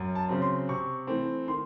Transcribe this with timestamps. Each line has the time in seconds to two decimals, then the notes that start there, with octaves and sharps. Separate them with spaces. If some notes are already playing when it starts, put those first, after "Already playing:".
Already playing: F#2
0.15 A5
0.29 C#3 F#3 C4
0.42 C6
0.69 C3 C#6
1.07 E3 A3 C4
1.47 D#3 C6